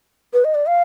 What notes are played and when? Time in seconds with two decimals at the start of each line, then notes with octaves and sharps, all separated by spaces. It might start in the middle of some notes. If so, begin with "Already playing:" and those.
0.33 B4
0.44 D#5
0.55 D5
0.66 F5